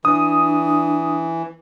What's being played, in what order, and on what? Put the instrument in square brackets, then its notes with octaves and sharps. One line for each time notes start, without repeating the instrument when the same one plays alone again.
[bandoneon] E3 [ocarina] D4 [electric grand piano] D#6